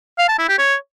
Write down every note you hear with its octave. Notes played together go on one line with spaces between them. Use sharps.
F5
A5
E4
G4
C#5